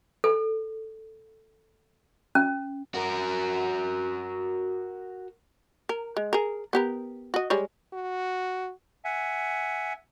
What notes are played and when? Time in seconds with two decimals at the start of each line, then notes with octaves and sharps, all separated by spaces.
0.24 A4
2.35 C#4
2.94 F#4 A#4
5.89 A#4
6.17 G#3
6.33 G#4 A#4
6.73 B3 G4 A#4
7.34 F#4 D#5
7.50 G3 G#3 C#5
7.93 F#4
9.05 E5 F#5 G#5